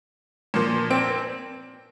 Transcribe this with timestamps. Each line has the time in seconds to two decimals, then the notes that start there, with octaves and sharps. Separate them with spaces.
0.54 A#2 F3 A#3
0.91 C4